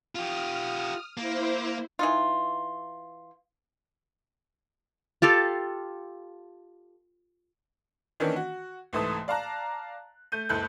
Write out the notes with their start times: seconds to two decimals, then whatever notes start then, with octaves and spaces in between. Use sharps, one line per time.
0.15 F4 G4 D#6 F6
1.17 A#3 E4 C5
1.99 E3 D#4 F4
5.22 F4 G4 A4 F5
8.20 D#3 E3 A#3 C#4 D4
8.36 F#4
8.93 C2 G#2 E3 A3 A5 D#6
9.28 D5 F5 A5 A#5 F#6
10.32 A3 G6 D#7
10.49 F#1 C#2 E4 A4 F#6 G6